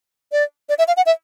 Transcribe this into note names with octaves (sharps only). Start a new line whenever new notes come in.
D5
D5
E5
F5
F#5
E5